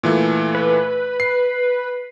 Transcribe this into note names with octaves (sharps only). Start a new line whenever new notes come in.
A#2 E3 A3
B4
C7